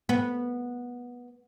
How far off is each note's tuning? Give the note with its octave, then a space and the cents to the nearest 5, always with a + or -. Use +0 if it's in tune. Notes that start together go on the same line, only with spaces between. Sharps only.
B3 -15